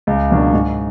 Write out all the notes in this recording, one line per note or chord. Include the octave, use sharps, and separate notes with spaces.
C#2
B2 F#3 A#3 D4
G#2